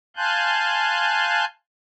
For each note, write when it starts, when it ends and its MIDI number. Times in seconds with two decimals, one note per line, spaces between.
0.17 1.45 77
0.17 1.45 80
0.17 1.45 81
0.17 1.45 84
0.17 1.45 90
0.17 1.45 91